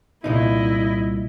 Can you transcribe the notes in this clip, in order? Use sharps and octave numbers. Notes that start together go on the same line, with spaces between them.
C2 A#2 D#4 E4 D#5